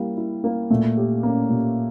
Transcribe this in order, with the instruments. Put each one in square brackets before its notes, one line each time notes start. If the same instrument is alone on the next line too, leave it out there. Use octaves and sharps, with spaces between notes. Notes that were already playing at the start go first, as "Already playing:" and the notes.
Already playing: [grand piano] G3 [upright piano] A#3 E4
[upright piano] E4
A#3
[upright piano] A#2 [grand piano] A3
[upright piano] G4
[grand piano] A#3 [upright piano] C#4
[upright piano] A#2